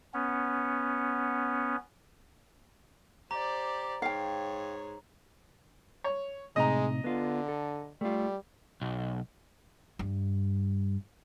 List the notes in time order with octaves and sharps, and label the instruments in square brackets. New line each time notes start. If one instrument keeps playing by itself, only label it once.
[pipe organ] B3 C#4
[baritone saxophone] G4 [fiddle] C5 D5 [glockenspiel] A#5
[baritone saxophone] G#2 [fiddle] C#5 [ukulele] F5 G5
[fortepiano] C#5
[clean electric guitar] A2 C3 D#4 [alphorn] G#3 [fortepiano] D#5 A#5
[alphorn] D3 [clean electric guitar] B3 F4
[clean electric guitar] A4
[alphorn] G3 [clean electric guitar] A3 F4
[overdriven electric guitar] B1
[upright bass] G2